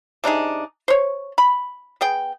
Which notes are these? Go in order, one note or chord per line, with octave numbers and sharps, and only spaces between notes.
C3 D4 D#4 G#4
C5 C#5
B5
B3 G#4 G5